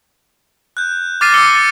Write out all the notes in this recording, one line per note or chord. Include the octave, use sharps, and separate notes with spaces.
F#6 G6
D6 F6 A6 A#6 C7 D#7
D6 E6 C#7 D#7 G7
A6 C#7 D#7